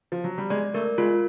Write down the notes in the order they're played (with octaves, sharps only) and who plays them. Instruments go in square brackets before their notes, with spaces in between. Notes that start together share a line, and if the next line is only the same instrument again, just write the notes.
[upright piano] F3
F#3
G3
[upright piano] G#3 [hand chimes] D5
[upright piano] A3 [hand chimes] A#4
[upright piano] G#3 [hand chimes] F4